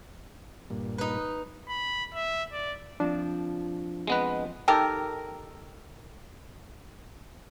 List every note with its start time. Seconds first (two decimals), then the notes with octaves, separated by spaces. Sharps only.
0.70 G2 A#2
0.98 D#4 B4
1.69 B5
2.14 E5
2.52 D5
3.00 F3 C4 D4
4.07 G#3 B3 C4 B4 D#5
4.68 D#3 G4 A4 A#4